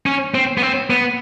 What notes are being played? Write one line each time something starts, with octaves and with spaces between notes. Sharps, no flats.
C#4
C4
B3
C4
B3